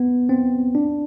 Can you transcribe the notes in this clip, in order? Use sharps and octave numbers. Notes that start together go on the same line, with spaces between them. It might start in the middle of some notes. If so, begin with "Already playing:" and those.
Already playing: B3
C4
D4